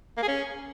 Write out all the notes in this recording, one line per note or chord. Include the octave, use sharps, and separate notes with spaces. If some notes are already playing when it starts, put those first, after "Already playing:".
A#3
G#4
C#4